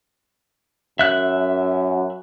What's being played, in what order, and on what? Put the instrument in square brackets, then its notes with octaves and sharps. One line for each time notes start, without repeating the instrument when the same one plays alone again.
[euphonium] F#2 [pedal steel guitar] E5 F#6